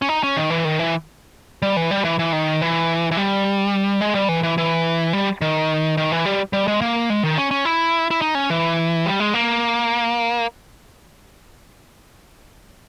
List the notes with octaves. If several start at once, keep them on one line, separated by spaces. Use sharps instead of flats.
C#4
D#4
C#4
D#3
E3
D#3
E3
G3
E3
G3
E3
E3
D#3
E3
E3
G3
G#3
G3
E3
E3
E3
G3
D#3
D#3
E3
G3
G3
G#3
A#3
G#3
D#3
C#4
C#4
E4
E4
D#4
C#4
E3
G3
G#3
A#3